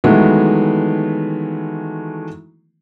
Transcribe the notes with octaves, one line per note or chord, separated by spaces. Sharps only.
D#3 E3 F#3 G#3 A3 B3